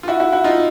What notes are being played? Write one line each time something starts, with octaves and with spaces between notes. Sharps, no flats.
F4
E4 F#4
E4 F#4
E4 F#4
D#4 F4